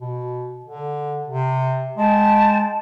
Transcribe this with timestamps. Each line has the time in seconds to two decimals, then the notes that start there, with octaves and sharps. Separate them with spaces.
0.01 B2
0.64 D3
1.28 C3
1.98 G#3 G5 A5